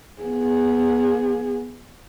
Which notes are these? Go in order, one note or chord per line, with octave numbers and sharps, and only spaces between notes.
B3 G#4